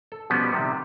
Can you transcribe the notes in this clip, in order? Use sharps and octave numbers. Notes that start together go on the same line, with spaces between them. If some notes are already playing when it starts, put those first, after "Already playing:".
A4
B2 F3 G3 B3 C#4
C3 D#3 G3